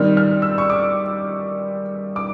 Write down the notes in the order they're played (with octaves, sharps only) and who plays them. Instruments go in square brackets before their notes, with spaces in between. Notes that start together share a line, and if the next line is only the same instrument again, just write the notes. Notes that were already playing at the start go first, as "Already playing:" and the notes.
Already playing: [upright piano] D#3 G3 C4 F6
F6
E6
C#6
D6
D6